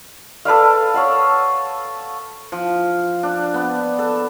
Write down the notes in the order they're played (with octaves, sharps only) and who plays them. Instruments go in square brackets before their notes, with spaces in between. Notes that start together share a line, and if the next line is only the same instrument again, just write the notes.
[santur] A4 B4 D5 F5
C#5 F5 F#5
[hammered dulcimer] F3
D4
B3
A4